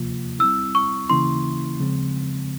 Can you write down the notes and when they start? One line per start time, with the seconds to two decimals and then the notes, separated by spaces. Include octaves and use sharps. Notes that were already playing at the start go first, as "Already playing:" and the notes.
Already playing: C3 F3 A#3 F4
0.39 G3 C4 E4 E6
0.75 C#6
1.09 C#3 E3 A#3 C#4 E4 C6
1.80 C#3 F3 G#3 C4